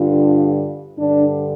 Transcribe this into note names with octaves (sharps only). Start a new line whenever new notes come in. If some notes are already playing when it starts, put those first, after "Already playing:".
Already playing: G2 D3 F4
G2 D3 D4